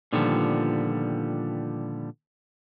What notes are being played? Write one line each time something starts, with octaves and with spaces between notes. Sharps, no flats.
A#2 D3 D#3 F3 G3 B3